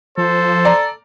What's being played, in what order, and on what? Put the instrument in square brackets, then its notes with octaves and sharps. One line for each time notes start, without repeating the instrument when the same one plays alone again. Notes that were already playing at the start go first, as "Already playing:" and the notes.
[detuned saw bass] F3 [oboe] A4 [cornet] C5
[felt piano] D5 A#5